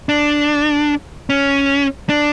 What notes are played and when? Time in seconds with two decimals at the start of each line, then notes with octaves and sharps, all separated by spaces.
0.09 D4
1.30 C#4
2.09 D4